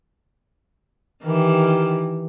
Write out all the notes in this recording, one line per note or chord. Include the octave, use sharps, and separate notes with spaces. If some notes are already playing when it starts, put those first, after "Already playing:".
D#3 E3 G4